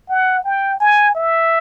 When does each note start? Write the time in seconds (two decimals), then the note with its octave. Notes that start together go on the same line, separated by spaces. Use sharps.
0.09 F#5
0.44 G5
0.80 G#5
1.15 E5